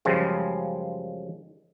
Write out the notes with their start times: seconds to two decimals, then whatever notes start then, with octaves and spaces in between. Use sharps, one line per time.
0.05 F#2 C#3 F3 G3 G#3 F4